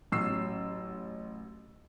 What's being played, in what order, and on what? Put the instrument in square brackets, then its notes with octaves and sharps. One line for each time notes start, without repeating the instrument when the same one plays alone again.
[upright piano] A1 F#3 C#4 E6 C7